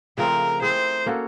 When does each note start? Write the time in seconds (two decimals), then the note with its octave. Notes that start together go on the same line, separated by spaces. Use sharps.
0.18 C#3 F3 A3 C4 A#4
0.62 A3 C4 E4 G#4 C5
1.06 A#3 C#4 F#4 A4